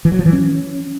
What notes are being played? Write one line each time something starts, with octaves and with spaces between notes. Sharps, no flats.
E3
F#3
F3
E3
C#4